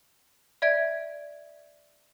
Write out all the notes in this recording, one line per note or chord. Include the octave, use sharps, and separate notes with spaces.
D5 E5 G#6 D7